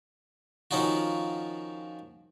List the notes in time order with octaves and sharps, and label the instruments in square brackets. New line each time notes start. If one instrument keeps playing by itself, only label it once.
[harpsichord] D#3 F3 C#4 D#4 F4 F#4